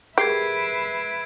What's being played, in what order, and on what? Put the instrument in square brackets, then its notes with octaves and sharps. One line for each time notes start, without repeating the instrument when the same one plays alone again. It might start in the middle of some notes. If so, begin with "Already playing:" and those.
[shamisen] G4 [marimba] G#4 A#4 [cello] B4 E5 [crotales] G#6 C7 D7